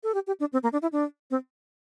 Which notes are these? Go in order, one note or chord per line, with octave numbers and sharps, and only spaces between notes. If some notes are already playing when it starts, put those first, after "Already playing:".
A4
G4
G4
D4
C4
A#3
D4
E4
D4
C4